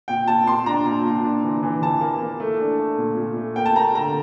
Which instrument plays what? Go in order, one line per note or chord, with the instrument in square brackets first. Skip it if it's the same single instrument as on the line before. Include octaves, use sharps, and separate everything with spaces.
[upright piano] A#2 G5
A#2 A5
A#2 C6
D4 A#5
A#2
A#2
D4
E3
E3
E3 A5
A#3
A#3
A3
D4
A3
A#2
A#2
A3
A#3 G5
A5
A#3 A#5
D3 A#5